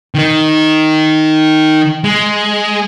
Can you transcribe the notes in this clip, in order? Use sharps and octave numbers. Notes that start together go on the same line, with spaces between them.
D#3 D#4
G#3